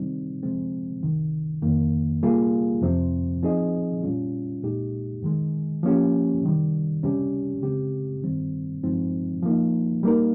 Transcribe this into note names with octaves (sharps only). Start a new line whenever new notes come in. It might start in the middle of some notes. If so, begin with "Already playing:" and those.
Already playing: C3 D#3 G3 C4 D#4
C3 F3 G#3 C4
C2 C3 D#3
F2 D#3 A#3
C3 G3 A#3 F4 G#4
F2 C3 F3 C4
F3 C4 D#4 G#4 D#5
A#2 G3 C#4 F4
C2 A#2 G#3 D#4 G4
G#2 D#3 G#3
F3 A#3 C#4 G4
C3 D#3 G3
C#2 C3 G3 C#4 G4
C#3 G#3 C4 G4
G2 D#3 G3 C4
G2 F3 G#3 C4 D#4
F3 A#3 D#4
G3 A#3 D#4 A#4